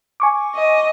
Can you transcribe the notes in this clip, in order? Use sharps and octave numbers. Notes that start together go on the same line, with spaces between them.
G#5 C#6 D6
D#5